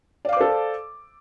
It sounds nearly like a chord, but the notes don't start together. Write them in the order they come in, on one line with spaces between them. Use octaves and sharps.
D5 F5 D6 C5 A4